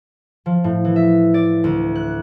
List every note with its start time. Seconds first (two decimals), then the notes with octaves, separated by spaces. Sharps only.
0.46 F3
0.64 A2
0.85 E3
0.96 E5
1.34 D5
1.64 D2
1.95 F#6